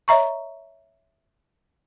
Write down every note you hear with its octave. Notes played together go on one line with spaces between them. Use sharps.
C#5 D#5 E5 A#5 C#6